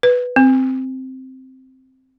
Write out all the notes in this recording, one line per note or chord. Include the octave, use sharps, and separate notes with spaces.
B4
C4